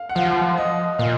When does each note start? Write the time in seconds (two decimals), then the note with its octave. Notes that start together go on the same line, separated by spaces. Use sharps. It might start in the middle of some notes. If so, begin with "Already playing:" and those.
Already playing: F5
0.09 F#5
0.15 F3 F5
0.57 D#5
0.99 A#2 F5